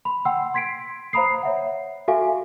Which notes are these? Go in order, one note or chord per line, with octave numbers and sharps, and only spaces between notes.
B5 C6
F#5 G5 C6 E6
C6 G#6 B6 C7 D7
C5 F5 A#5 B5 D#6 C7
C#5 E5 F#5
F#4 A4 E5 F5 G#5 C#6